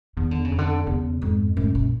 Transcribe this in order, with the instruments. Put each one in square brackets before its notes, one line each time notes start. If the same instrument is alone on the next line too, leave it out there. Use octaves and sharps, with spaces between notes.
[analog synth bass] E2 [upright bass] D#3
[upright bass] D3
C#3
[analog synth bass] F2
[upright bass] D3
[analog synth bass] E2 [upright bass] C#3
[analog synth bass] F2 [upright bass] G#2
[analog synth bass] F#2 [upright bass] A2
[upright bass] A#2